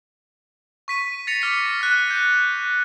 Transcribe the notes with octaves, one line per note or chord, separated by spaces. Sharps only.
C#6 B6 D#7
A6 A#6 C#7 F7
D6 F6 B6
F6 F#6
G6